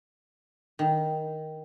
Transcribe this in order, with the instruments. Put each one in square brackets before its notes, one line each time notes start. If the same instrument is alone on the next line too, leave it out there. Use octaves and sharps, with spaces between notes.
[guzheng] D#3